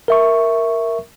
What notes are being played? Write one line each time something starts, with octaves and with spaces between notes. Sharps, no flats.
A#4 E5 C#6